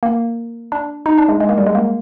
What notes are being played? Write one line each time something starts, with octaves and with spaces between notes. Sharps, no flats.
A#3
D4
D#4
D4
G#3
G#3
A#3
G3
G#3
A#3